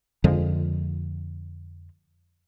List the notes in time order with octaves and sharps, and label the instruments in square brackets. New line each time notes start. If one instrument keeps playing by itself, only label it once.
[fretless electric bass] F2 D3 F3 G#3